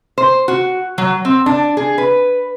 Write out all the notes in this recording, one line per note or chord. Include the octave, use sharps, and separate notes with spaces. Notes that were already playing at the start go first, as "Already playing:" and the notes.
C5
F#4
F#3
C4
D4
G#4
B4